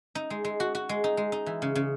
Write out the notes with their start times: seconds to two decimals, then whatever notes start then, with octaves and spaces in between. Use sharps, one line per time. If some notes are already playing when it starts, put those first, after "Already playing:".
0.15 D#4
0.30 G#3
0.44 G#3
0.60 F#4
0.75 F#4
0.89 G#3
1.04 D#4
1.17 G#3
1.32 D#4
1.46 E3
1.62 C#3
1.75 C#3